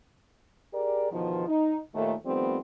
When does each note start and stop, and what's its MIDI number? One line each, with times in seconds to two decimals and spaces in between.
0.73 1.11 67
0.73 1.11 68
0.73 1.11 70
0.73 1.11 74
1.11 1.48 40
1.11 1.48 47
1.11 1.48 51
1.11 1.48 53
1.48 1.78 63
1.95 2.13 39
1.95 2.13 46
1.95 2.13 51
1.95 2.13 57
2.25 2.57 51
2.25 2.57 53
2.25 2.57 55
2.25 2.57 57
2.25 2.57 59
2.25 2.57 60